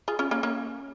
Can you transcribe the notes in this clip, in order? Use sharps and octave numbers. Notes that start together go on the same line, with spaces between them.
F4 G#4
C#4 F4
A#3 C#4
A#3 C#4